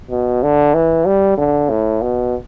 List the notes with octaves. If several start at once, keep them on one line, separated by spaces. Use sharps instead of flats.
B2
D3
E3
G3
D3
A2
B2